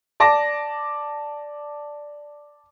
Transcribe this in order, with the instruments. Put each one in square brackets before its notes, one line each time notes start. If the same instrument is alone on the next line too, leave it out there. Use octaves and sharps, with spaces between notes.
[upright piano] D5 A5 D6 A#6